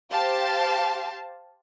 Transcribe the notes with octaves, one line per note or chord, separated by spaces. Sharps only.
G4 C5 F5 A5